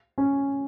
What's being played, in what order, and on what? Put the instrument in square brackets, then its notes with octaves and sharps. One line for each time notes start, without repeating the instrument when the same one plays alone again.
[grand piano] C#4